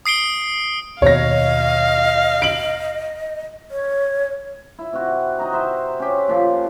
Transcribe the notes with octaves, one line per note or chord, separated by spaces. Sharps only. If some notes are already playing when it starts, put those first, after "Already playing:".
D#6 C7 D7 G7
D#2 B2 C#5 D#5 F5 A#6
D7 F#7
C#5
E4
C3 F#4
D#4 D#5 A#5
C5 E5
C#4 G4
A#2 F3